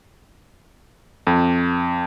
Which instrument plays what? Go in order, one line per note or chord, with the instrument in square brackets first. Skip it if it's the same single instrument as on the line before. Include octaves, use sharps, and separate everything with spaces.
[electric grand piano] F2